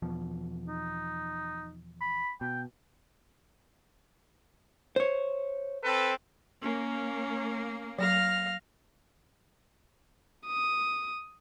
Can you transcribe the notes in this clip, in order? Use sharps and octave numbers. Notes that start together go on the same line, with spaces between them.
E2 B2 F3
D#4
B5
B2 G5
C5 C#5
C4 A4 B4
A#3 C#4
F#3 F5 F6 A#6
D#6